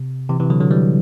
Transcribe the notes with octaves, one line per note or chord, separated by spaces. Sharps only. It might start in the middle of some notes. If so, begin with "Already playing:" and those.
Already playing: C3
C3 E3
C3 E3
D3 F#3
D3 F#3
E3 G3